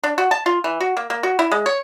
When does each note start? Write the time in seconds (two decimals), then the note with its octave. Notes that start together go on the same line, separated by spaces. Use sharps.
0.04 D4
0.18 F#4
0.31 A5
0.46 F4
0.64 E3
0.80 F#4
0.97 A#3
1.10 A#3
1.23 F#4
1.39 E4
1.52 G#3
1.66 C#5